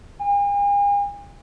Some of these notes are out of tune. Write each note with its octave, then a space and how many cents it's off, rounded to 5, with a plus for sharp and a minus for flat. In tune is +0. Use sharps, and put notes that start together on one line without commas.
G#5 -45